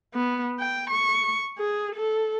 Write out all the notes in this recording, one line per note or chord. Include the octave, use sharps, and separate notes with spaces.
B3
G5
C#6
G#4
A4